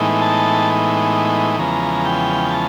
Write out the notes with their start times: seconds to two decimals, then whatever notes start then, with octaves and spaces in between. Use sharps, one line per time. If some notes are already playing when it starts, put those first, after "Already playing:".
Already playing: A2 E3 G#3 B3 D#4
0.21 A5
1.59 E2 C#3 F3 G#3 B3 A#5
2.05 G5
2.51 A5